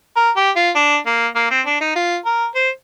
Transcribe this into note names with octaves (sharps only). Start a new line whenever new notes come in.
A#4
G4
F4
D4
A#3
A#3
C4
D4
D#4
F4
A#4
C5